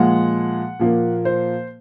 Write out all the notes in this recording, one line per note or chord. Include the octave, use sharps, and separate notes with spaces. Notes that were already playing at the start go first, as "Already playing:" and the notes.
Already playing: A#2 F3 G#3 F#5
A#2 F3 A#3
C5